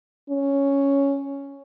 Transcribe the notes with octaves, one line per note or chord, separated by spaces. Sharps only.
C#4